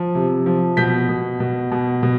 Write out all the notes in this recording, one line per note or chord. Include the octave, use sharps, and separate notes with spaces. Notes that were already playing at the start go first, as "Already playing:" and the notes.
Already playing: F3
C3
F3
B2 G6 B6
B2
B2
B2
B2